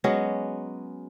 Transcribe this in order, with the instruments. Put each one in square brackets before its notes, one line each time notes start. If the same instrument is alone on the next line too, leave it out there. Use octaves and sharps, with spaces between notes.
[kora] F#3 G#3 B3 C#4